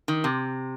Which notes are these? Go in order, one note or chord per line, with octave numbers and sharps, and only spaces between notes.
D#3
C3